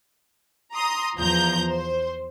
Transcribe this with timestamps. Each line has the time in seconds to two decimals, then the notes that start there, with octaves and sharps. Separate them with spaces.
0.74 A#5 C6 D#6
1.18 E2 F3 A#5 G6
1.69 C5